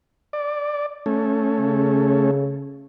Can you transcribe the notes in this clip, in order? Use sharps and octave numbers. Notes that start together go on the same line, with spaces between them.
D5
A3 C#4
C#3